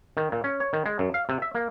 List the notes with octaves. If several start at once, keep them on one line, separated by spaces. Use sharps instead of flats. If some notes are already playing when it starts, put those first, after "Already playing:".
D#3
A#2
C#4
C#5
D#3
G#3
F#2
F5
C3
E5
A#3